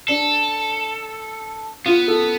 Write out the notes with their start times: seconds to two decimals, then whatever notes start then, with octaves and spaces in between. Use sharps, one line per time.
0.08 D4 A4
1.86 B3 F4
2.08 A4